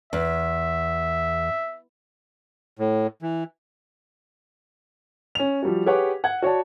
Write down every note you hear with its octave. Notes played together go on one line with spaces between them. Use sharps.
E2 E5
A2
E3
C#4 F7
F3 G3 F#4
G4 G#4 B4 C#5 F#5 D6
F#5 G#6
F#4 C#5 D5 A5